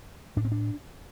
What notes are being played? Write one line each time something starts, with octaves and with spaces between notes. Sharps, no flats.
A2 D4
C4
D4